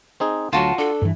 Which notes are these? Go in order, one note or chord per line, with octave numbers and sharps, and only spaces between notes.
C4 D#4 G#4
D2 F#3 F4 F#4 A5
D4 A4
G2 E3